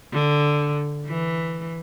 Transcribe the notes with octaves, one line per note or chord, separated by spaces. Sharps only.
D3
E3